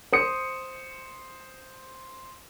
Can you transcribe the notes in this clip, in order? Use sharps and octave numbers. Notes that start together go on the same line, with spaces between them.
C5 D#6 C#7